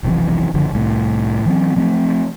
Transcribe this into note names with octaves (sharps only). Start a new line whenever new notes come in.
F1 B1 F2 E3
F#1 D3 F3
C2 A2
E3 F#3 C4
F3 A3 C4